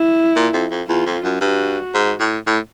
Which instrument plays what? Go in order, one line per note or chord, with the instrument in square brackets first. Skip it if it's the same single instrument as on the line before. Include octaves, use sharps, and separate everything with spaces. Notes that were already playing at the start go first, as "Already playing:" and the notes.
Already playing: [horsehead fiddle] E4
[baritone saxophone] A#2
F2
F2
[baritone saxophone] E2 [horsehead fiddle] F4
[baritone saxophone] F2
F#2
[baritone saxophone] G2 [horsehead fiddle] F#4
[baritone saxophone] G#2
A2
A2